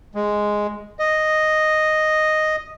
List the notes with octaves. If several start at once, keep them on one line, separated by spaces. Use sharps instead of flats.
G#3
D#5